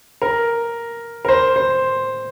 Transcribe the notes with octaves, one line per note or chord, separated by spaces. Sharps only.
A#4
A#4
C5
C5